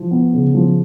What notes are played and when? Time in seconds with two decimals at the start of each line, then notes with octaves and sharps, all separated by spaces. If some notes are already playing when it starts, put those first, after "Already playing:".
Already playing: F3
0.11 B3
0.33 C#3
0.54 F3